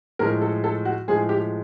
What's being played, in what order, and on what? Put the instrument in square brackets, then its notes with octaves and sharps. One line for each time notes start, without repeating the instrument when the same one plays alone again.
[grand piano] A2 F3 G#3 [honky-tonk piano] A#4
[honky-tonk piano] A4
A4
F#4
[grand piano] A2 F3 G#3 [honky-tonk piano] G#4
[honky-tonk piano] G4